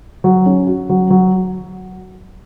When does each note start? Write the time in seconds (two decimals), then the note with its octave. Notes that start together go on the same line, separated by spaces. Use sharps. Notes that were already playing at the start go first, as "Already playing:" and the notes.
0.24 F#3
0.46 C#4
0.67 F#4
0.89 F#3
1.10 F#3